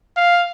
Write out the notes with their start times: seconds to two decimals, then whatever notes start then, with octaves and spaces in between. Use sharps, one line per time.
0.16 F5